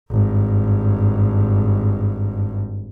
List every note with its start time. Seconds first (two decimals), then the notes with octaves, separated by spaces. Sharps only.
0.10 G#1 G2